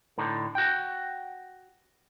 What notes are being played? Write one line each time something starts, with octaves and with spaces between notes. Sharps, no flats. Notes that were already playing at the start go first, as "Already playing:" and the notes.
A2 D3 D#4
F#4 G5